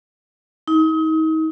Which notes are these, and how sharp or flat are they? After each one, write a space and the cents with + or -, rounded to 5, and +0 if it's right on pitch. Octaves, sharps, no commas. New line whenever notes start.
D#4 +35